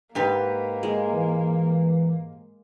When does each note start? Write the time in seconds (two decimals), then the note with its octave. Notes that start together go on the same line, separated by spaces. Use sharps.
0.15 G#2 A#3 G4 B4
0.83 G#3
1.13 E3